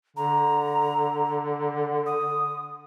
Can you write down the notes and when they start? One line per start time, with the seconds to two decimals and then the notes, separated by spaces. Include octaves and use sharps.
0.17 D3 A#5
2.06 D#6